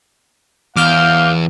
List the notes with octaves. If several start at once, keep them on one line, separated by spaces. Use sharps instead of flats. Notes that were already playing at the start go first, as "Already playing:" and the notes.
E2 F5 D6 F6 G6